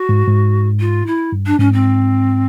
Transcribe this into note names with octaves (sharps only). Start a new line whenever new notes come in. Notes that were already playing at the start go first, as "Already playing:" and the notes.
Already playing: F#4
G#2
G#2
F4
E4
G2
D4
G#2 C#4
C4